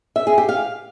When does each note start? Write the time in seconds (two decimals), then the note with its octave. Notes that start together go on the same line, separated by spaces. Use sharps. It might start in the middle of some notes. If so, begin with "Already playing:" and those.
0.16 E5
0.27 G#4
0.38 G4
0.49 F5